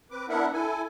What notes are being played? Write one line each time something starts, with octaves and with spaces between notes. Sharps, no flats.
C4 B4 D6
B3 D4 E4 A#4 E5 F#5
E4 A4 G#5